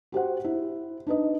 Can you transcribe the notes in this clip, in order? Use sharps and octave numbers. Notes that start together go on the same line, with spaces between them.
F#4 G4 C5 F#5
E4
D4 D#4 B4 D#5